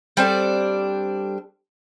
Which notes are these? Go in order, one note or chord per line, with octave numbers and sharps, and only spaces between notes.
G3 C4 D4 A4